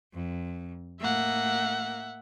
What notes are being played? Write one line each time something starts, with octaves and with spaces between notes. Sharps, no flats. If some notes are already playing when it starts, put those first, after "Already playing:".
F2
A2 A#3 E5 F#5